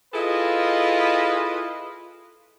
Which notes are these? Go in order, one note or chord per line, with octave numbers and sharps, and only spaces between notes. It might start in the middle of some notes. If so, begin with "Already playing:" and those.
E4 F4 G#4 A4 B4 D#5